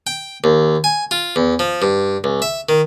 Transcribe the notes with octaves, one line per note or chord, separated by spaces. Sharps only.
G5
D#2
G#5
F4
E2
F3
G2
C#2
E5
D#3